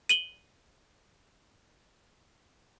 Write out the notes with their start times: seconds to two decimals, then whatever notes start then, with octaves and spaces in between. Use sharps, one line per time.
0.09 D#7 F#7 G7